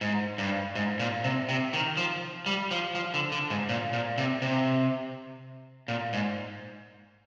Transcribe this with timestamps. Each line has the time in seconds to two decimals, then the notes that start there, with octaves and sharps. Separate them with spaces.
0.01 G#2
0.38 G2
0.75 G#2
0.99 A#2
1.24 C3
1.49 C3
1.73 D#3
1.97 F3
2.46 G3
2.71 F3
2.95 F3
3.14 D3
3.32 D3
3.50 G#2
3.69 A#2
3.93 A#2
4.18 C3
4.42 C3
5.88 A#2
6.13 G#2